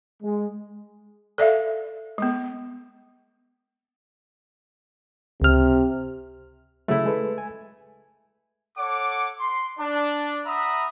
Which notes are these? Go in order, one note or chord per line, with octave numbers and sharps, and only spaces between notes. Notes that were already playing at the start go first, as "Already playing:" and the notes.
G#3
A4 D5 E5 F5
G#3 B3
C#2 C3 F6
C#3 F#3 G#3 A3 E4
G#3 A4 B4
G#5
A4 C#5 F#5 D6
C6
D4
E5 F#5 A#5 B5 D#6